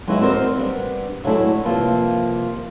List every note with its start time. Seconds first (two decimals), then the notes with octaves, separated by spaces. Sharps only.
0.07 F#3 G#3 B3 D#4 E4
0.21 C4 D#4 F#4 A#4 C5 D5
0.56 G3 B3 D4
1.24 A2 F#3 G#3 A3 D4 E4
1.65 C3 F3 G3 A#3 B4